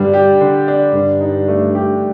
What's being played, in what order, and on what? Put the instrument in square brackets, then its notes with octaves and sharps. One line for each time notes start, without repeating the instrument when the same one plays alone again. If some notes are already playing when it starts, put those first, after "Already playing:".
Already playing: [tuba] G2 [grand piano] D3 G3 D4
[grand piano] G4
D3
D4
[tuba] G2 [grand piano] D3
[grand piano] D#4
A3
G4